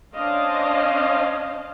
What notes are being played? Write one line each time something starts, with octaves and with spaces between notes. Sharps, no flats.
C#4 D4 C5 D#5 F5